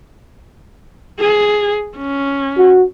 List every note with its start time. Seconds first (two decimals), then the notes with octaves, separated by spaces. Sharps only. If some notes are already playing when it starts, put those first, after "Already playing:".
1.19 G#4
1.97 C#4
2.57 F#4